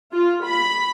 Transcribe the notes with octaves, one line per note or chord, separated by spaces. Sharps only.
F4
B5